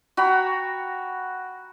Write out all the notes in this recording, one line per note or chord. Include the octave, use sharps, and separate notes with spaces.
F#4 G5 A#5 B5